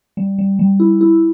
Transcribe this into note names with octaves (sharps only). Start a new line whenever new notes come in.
G3
G3
G3
E4
E4